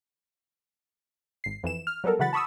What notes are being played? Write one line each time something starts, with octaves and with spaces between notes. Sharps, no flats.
G#1 C7
F2 E3 E7
F6
F#3 G3 B3 A4 A#4
C#3 E3 F#3 F#5 B5 A6
A5 B5 C#6 D#6 E6